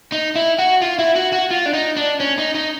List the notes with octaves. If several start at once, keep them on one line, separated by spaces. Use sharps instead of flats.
D#4
E4
F#4
F4
E4
F#4
F#4
F4
D4
D#4
D4
C#4
D#4
D#4